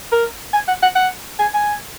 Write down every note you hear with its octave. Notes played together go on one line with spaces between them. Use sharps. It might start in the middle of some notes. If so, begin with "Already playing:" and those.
A#4
G#5
F#5
F#5
F#5
G#5
G#5